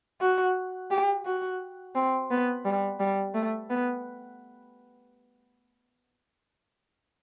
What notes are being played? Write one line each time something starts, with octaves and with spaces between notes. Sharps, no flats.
F#4
G4
F#4
C4
B3
G3
G3
A3
B3